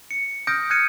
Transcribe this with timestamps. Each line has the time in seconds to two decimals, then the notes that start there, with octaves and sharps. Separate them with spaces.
0.11 C#7
0.47 D#6 F6 G6 A#6 D7
0.70 F6 F#6 G#6 A#6 C#7 D#7